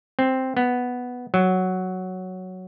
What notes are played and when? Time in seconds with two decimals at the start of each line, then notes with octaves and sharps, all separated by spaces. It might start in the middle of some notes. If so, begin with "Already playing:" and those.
0.19 C4
0.57 B3
1.34 F#3